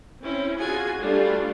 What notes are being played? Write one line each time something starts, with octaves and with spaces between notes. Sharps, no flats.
C4 C#4 E4
F4 F#4 G#4 G#5
G3 A3 D4 F4